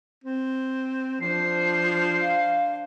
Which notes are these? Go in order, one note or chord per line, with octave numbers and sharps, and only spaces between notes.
C4
F3 D4 C5 C7
F5